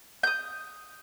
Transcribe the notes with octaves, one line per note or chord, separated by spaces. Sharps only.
D#6 G6